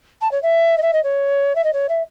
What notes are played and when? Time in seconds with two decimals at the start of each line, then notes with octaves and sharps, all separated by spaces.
0.21 A5
0.31 C#5
0.42 E5
0.77 D#5
0.82 E5
0.93 D#5
1.03 C#5
1.55 E5
1.64 D#5
1.73 C#5
1.88 E5